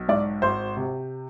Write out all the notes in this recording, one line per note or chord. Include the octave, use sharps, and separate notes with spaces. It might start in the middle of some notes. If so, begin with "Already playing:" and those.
Already playing: B1
G#2 D5
G#1 C5
C3